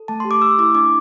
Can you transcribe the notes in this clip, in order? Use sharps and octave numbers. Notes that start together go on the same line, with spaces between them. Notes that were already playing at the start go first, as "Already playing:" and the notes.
Already playing: A4
A3 A5
C6
G4
D6
A3 E6
E4 D6
D4 D6